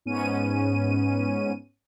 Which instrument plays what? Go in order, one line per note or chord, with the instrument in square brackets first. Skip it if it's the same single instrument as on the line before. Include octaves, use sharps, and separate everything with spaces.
[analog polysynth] G#2 B3 C#4 D#7